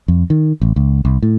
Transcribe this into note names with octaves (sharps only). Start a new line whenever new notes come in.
F2
D#3
A1
C#2
C2
A2